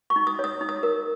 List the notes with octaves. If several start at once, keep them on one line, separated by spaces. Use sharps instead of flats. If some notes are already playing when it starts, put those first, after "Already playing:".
C#6
D#4
D#6
C#5 D#6
D#4
D#6
A#4